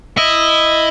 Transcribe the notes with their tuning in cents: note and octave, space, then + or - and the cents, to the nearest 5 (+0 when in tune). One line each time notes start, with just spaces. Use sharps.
E4 +0 D#5 +0